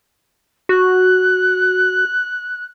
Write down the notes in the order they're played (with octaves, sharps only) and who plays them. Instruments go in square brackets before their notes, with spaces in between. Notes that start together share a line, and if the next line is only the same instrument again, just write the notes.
[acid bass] F#4 [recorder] F#6